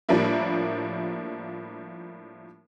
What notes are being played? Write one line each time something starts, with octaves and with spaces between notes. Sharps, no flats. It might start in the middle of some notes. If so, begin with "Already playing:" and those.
A2 F3 G3 A#3 D4 E4